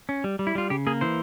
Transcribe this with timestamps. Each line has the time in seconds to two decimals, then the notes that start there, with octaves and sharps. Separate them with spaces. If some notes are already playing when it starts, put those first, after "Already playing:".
0.09 C#4
0.24 G3
0.39 G3
0.47 E4
0.55 G3 F4
0.70 C#3 G4
0.87 A#3 G#4
1.01 E3 C5